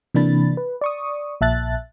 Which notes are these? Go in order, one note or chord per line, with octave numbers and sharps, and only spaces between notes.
C3 E3 A#3 D4 B5 A6
B4
D5 C#6 D#6
A#1 A#2 E5 A5 F#6 A6